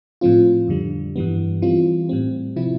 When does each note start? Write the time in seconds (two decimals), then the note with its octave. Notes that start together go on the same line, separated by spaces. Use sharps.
0.21 A2 F3 C4 F4
0.68 F2 D3 G3
1.16 G2 E3 G3 B3
1.62 E3 G3 C4 F4
2.09 A2 G3 C4
2.56 C3 F3 C4 E4